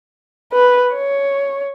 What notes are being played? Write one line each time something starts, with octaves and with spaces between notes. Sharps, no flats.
B4
C#5